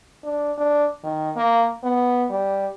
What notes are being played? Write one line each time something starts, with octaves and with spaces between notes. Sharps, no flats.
D4
D4
D#3
A#3
B3
G3